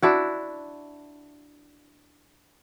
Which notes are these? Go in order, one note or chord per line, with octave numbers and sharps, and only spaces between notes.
D4 E4 F#4